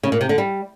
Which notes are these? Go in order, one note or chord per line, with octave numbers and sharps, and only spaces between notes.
C#3
A#2
C3
D3
G3